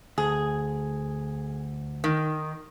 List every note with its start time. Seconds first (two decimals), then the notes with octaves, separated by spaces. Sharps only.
0.18 D2 G#4
2.04 D#3